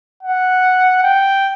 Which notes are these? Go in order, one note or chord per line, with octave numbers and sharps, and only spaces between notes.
F#5
G5